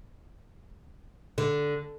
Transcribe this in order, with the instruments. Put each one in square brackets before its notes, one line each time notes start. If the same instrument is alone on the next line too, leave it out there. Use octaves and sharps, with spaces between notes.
[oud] D3